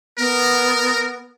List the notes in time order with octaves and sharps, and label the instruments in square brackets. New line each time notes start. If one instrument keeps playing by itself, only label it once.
[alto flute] B3 [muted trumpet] A#4